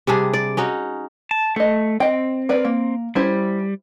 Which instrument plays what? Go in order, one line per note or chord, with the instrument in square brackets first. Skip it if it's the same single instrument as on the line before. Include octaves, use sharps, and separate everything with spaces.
[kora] C3 G3 D4 G#4
D5
C#4 D#4 F#4
[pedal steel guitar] A5
[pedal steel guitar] A3 [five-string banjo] A4 D#5
[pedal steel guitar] C4 [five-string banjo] D#5 G5
[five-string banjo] A#4 B4 D5
A#3
[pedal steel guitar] G3 [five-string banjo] C#4 E4 C5